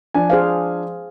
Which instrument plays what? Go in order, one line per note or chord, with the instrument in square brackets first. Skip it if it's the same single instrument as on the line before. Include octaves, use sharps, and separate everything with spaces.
[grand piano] F3 D4 G#5
[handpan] G#4 C5 F5